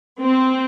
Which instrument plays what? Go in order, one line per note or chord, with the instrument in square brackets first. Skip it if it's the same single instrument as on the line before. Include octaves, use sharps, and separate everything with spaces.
[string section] C4